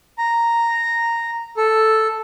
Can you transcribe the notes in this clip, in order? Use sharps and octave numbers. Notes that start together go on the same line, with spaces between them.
A#5
A4